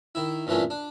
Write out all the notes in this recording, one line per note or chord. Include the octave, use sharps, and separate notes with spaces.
D#3 E4
G2 A#2 E3 G#3 A3 C#4
D4